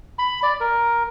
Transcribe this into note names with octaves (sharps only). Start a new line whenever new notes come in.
B5
D5
A#4